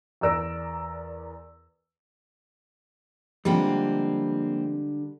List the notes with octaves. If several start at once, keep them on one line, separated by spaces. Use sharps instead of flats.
E2 A#4 D5 E6 A#6 D7
D3 F3 G3 G#3 A#3 C4